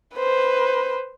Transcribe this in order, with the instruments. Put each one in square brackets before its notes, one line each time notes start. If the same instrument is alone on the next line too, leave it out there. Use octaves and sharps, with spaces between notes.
[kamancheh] B4 C5